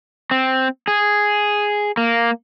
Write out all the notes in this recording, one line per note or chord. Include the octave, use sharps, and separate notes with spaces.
C4
G#4
A#3